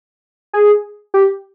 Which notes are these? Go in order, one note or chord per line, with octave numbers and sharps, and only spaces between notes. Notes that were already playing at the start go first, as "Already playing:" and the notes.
G#4
G4